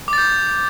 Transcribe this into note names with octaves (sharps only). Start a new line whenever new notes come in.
D6 G6 A6